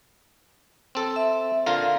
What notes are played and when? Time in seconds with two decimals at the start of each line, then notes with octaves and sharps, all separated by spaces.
0.95 C4 A4
1.16 E5
1.66 D3 F4 A#4 F5